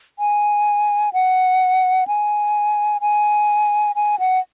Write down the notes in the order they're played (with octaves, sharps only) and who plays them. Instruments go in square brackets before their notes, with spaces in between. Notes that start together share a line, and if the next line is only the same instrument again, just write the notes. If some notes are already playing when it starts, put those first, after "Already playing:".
[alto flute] G#5
F#5
G#5
G#5
G#5
F#5